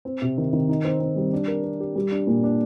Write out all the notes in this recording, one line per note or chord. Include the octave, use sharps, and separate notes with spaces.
C4
C3
D#3
D#3
D#4
C4
C4
G3
D4
A#4
A#4
G4
G3
D4
A#2
D4